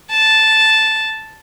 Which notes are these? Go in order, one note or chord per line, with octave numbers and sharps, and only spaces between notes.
A5